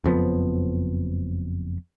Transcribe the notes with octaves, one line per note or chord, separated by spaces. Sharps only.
F#1 F2 F3 B3